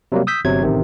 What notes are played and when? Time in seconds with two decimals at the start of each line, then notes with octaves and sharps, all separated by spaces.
0.12 C3 F#3 G3 A#3
0.27 D#6 E6 G6 B6
0.45 G1 C3 F#3 G#6
0.63 A1 C3 D#3